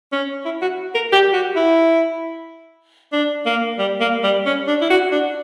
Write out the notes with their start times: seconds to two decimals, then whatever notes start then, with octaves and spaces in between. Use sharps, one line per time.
0.12 C#4
0.45 E4
0.62 F#4
0.95 A#4
1.12 G4
1.33 F#4
1.56 E4
3.12 D4
3.46 A#3
3.79 G3
4.00 A#3
4.23 G3
4.46 C#4
4.67 D4
4.81 E4
4.90 F#4
5.11 D4